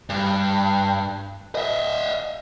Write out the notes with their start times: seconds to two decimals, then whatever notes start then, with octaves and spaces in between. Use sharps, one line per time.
0.09 G2
1.55 D#5 E5